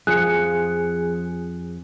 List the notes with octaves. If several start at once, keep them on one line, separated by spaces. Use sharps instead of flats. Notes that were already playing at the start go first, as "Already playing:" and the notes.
F2 F3 G#4 F#6 C#7